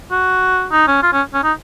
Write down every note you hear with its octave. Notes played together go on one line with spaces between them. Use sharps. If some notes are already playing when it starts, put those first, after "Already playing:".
F#4
D#4
C#4
F4
C#4
C#4
D#4